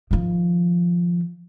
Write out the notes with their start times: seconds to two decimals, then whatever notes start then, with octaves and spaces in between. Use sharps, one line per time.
0.11 D#3 F3